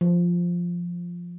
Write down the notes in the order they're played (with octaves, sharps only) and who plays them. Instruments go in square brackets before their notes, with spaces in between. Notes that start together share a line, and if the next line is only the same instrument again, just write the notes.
[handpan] F3